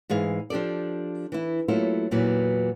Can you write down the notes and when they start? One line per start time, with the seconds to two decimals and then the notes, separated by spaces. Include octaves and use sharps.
0.10 G#2 E3 G#4 F5
0.50 F3 D4 G4 A4 D5
1.32 E3 E4
1.68 F#3 A3 A#3 E4 F4 A4
2.11 E2 A#2 E3 F#3